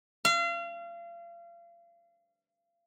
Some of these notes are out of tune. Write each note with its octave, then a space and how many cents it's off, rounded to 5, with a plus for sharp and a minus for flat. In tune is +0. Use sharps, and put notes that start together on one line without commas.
F5 -35